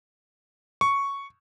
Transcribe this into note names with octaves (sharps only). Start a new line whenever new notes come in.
C#6